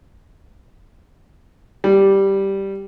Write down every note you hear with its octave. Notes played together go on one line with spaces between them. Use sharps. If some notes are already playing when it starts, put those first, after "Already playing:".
G3